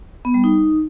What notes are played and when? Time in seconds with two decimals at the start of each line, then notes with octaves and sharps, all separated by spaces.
0.25 B3
0.34 G3
0.44 D#4